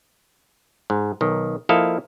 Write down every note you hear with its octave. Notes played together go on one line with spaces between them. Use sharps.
G#2
B1 D#3
F3 A#3 E4 A4 D#5 F5